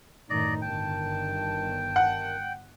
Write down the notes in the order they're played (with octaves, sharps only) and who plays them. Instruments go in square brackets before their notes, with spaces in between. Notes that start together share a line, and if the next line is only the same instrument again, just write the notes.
[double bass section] F#2 A2 D#3 [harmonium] D#4 [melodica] D5 D#5
[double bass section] G1 [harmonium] D#3 A5 [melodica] G5
[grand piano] F#5